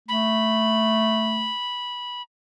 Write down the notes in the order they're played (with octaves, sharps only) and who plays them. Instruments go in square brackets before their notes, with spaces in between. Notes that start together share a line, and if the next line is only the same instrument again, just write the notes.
[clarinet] A3 [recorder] B5